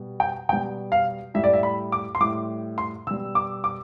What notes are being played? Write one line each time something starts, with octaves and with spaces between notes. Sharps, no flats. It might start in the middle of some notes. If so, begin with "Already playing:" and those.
Already playing: B2 G3
G5
B2 G3 G5
F5
A2 G3 E5
D5
E5
B5
D6
C6
A2 G3 D6
C6
B2 G3 E6
D6
D6